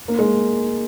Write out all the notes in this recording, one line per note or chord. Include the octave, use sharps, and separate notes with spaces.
A#3
G#3